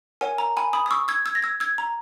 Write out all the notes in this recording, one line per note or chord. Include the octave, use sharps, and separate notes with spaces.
A#4 C#5 F#5 G#5
A#5
G#5 B5
B5 D#6
D#6
C#6 E6
E6 G#6
E6 G#6
A#6
E6 G#6
E6 G#6
A#5